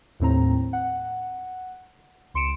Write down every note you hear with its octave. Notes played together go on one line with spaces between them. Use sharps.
D#2 A2 C4 A#5
F#5
C#2 C6 C#7 D7 E7